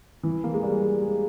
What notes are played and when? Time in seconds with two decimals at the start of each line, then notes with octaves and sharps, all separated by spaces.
0.23 E3
0.44 A#3
0.54 G#3
0.63 G3
1.02 G#3